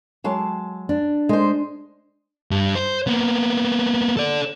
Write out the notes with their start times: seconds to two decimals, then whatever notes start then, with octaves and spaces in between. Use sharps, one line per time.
0.24 F#3 G#3 A5
0.89 D4
1.29 G#3 C5
2.51 G2 G3
2.75 C5
3.07 A#3 B3
4.17 A4 D5